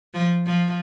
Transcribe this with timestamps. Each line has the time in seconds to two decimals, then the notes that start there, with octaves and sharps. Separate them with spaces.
0.14 F3
0.46 F3